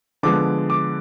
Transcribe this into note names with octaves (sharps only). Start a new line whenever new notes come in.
D3 F3 G#3 B3 D6
D6